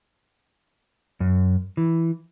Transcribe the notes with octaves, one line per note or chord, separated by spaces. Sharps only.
F#2
E3